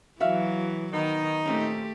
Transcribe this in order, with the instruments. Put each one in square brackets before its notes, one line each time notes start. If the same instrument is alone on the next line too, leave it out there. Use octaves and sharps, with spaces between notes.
[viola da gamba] E3 F#3 [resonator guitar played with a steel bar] F#4 E5 F5
[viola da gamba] D#3 [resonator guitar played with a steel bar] B3 [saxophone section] D#4
[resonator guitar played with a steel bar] A#2 C4 C#4 [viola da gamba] A3 G4